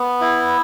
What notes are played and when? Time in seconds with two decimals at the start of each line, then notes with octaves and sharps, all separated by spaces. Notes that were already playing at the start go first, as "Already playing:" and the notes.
Already playing: B3
0.21 E4